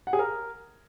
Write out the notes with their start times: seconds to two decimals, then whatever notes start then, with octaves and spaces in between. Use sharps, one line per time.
0.07 F#5
0.13 G#4
0.19 A#4